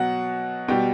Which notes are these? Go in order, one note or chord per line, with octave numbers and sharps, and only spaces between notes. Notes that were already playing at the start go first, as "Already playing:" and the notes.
Already playing: B2 F#3 F#5
B2 G3 G5